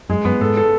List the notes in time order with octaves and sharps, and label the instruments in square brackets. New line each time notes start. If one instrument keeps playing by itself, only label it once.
[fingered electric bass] F#2 [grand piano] G#3
[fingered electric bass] F#2 [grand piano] B3
[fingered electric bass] G#2 [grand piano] A4
[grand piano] A4